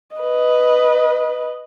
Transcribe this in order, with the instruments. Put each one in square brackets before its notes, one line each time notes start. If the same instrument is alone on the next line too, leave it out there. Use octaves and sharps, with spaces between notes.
[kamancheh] B4 D#5